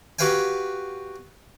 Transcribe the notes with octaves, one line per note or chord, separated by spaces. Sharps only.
F#4 G4 B4 F5 G5 G#5